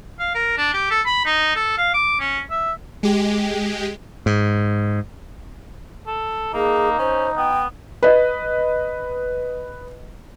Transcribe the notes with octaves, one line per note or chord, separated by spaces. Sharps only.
F5
A#4
D4
G4
A4
B5
D#4
A4
F5
D6
C#4
E5
G#3 G4
G#2
A4
A#3 D#4 G#4
C#4 C5
B3 G5
B4 D#5